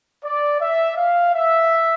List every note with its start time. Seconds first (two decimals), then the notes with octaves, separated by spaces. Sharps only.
0.24 D5
0.60 E5
0.97 F5
1.34 E5